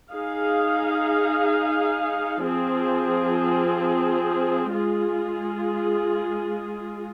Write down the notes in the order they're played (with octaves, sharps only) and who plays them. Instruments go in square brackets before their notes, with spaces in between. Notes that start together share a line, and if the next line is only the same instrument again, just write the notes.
[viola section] D#4 G#4 F5
F3 C4 G#4
G#3 F4 G#4